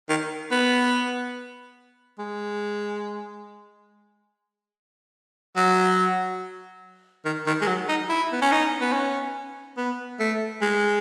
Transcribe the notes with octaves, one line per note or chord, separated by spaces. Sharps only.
D#3
B3
G#3
F#3
D#3
D#3
G#3
F#3
D#4
E4
B3
C#4
D#4
B3
C#4
B3
A3
G#3